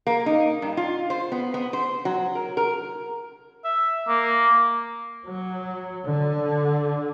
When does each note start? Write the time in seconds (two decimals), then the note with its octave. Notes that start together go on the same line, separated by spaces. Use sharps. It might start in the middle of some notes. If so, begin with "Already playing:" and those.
0.07 A#3
0.26 D#4
0.62 G2
0.77 F4
1.10 C5
1.32 B3
1.54 B3
1.73 C5
2.05 F#3
2.35 A#4
2.57 A#4
3.65 E5
4.08 A#3
5.26 F#3
6.05 D3